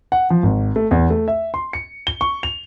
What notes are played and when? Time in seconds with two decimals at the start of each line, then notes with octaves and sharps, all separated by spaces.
0.12 F#5
0.30 F3
0.43 G#1
0.76 A3
0.91 E2
1.10 A3
1.28 E5
1.54 C6
1.73 C#7
2.07 G7
2.21 C#6
2.43 F7